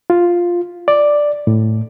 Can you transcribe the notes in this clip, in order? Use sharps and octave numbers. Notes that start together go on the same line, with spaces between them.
F4
D5
A2